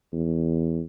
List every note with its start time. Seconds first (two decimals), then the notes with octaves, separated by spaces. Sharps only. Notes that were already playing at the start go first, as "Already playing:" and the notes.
0.13 E2